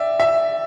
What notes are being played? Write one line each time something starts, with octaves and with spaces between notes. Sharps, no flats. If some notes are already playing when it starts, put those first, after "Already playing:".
Already playing: D5 E5 G5
E5